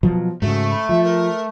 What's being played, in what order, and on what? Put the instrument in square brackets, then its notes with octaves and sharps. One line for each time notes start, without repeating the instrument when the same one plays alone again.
[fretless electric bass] B2 F3 F#3
[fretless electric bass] G#2 C#3 [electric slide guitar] A3 [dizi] F#4
[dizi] B5
[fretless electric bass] F3 [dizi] E5
[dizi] A#4